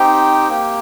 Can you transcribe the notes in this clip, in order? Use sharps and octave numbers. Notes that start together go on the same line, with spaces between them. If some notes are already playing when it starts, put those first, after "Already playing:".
Already playing: C4 D#4 G4 G5
A#3 G4